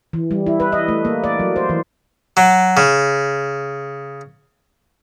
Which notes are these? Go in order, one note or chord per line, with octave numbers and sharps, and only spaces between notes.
E3
G3
E4
B4
D#5
A3
A#3
D5
F#3
C5
E3
F#3
C#3